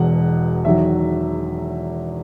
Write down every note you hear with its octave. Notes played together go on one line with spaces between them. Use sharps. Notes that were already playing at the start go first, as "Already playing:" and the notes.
Already playing: E1 E2 B2 F#5
E2 D#3 F#3 E5